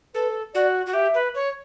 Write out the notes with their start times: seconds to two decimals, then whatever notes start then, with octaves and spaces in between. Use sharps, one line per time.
0.14 A4 B4
0.54 F#4 D5
0.86 F#4
0.94 G4 E5
1.15 B4
1.35 C#5